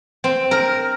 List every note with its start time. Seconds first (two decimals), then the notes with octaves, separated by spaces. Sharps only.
0.24 C4
0.51 A#4